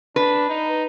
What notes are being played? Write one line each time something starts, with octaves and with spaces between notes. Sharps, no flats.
D4 B4
D#4